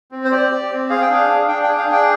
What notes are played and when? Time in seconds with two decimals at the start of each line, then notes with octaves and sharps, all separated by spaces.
0.12 C4
0.25 C5
0.32 G4 D5
0.51 G4
0.71 C4
0.90 G#4 F5
1.02 G5
1.09 D4 F5
1.30 D4
1.48 D4 G5
1.63 G#4 G5
1.78 F5
1.88 D4
1.93 G5